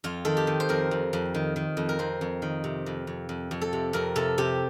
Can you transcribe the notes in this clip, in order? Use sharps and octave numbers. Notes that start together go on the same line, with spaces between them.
F2 F4
D#3 A4
G4
D#3
C5
F2 A#4
F2
F2
D#3
D#3
F2
A#4
F2 C5
F2
D#3
C3
F2
F2
F2
F2
A4
C3
F2 A#4
C3 A4
C3 G4